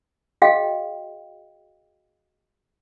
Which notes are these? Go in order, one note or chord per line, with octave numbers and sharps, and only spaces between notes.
F#4 G#4 D#5 F5 G5